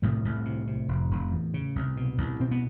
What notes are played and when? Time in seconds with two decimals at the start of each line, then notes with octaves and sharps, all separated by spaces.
0.02 C2 A2 A3
0.25 C2
0.45 C3
0.67 C3
0.88 F1
1.11 F1
1.32 E2
1.54 C#3
1.76 C2
1.97 B2
2.18 C2
2.40 B2 C4
2.51 B3